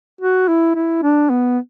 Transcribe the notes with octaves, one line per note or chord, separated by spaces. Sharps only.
F#4
E4
E4
D4
B3